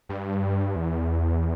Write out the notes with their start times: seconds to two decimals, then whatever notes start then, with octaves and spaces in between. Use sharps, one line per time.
0.09 G2
0.76 E2